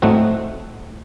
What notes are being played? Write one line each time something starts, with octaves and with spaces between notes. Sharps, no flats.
A2 A3 C4 D#4 F#4